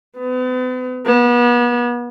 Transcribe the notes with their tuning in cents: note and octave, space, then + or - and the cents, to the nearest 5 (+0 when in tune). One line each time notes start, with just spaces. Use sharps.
B3 +40
B3 -35